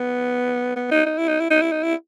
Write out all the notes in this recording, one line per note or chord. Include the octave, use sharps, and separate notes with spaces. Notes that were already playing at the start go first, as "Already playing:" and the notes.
Already playing: B3
B3
D#4
D#4
E4
D#4
E4
D#4
E4
D#4
E4